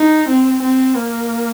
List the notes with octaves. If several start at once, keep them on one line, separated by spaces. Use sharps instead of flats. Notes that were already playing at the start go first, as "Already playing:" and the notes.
Already playing: D#4
C4
C4
A#3